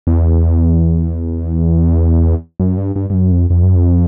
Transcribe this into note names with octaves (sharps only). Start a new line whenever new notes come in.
E2
F#2
G2
G2
G2
F#2
F2
F2
F#2
F2